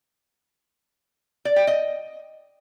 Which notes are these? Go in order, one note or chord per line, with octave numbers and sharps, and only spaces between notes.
D5
G5
D#5